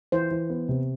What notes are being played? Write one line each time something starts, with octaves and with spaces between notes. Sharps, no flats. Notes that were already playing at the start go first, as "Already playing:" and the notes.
E3 C5
E3
B3
C3